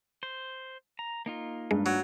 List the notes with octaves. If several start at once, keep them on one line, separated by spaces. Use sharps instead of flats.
C5
A#5
A#3 D#4 F4
G2 G#3
F#3